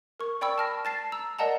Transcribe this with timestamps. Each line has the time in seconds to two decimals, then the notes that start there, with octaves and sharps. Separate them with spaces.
0.20 A#4 C#6
0.41 D5 G5 B5 C#6 E6
0.58 A5 F6 A#6
0.85 A5 A6 C7
1.12 A#5 E6
1.39 A#4 D5 D#5 F#5 A5 A#5